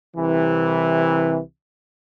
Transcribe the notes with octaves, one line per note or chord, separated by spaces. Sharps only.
C2 C3 E3